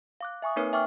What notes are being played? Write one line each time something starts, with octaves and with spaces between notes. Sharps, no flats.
F5 D6 F#6
E5 G#5 C#6 D#6
A#3 C4 D#4 A#4 B4 C#5
E5 G5 G#5 C#6 D6 F6